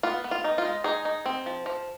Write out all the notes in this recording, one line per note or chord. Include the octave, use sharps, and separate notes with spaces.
B3 F4
B3
F4
D#4
F4
G#3
D#4 G#4
D#4
C4
F3
F3